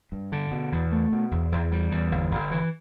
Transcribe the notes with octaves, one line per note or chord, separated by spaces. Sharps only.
G2
D3
B2
E2
A3
B2
E2
E2
G3
E2
G1
G1
E3